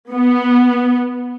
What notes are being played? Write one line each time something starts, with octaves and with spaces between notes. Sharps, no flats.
B3